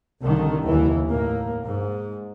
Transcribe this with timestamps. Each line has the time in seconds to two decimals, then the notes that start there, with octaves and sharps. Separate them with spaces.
0.22 C2 D3 D#3
0.67 D#2 E3
1.08 A2 A#3
1.64 G#2